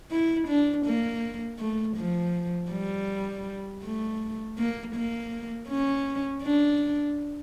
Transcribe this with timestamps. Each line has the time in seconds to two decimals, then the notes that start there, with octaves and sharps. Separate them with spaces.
0.11 E4
0.48 D4
0.86 A#3
1.59 A3
1.97 F3
2.71 G3
3.83 A3
4.58 A#3
4.95 A#3
5.69 C#4
6.43 D4